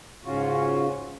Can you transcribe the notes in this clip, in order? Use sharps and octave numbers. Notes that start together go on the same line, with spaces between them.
G#2 C#3 C#4 F4 F#4